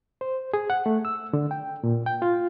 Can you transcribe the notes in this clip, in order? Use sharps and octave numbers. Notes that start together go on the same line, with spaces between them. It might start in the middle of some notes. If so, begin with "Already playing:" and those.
C5
G#4
F#5
A3
E6
D3
G5
A#2
G5
F4